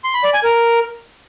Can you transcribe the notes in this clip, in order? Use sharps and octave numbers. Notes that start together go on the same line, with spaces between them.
C6
B5
D5
G#5
A#4